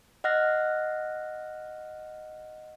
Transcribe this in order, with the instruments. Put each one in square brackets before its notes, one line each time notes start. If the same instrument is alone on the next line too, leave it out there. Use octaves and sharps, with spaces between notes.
[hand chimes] D#5 F#5 F6 F#6 A#6